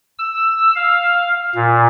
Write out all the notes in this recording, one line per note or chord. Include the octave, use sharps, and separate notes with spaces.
E6
F5
A#2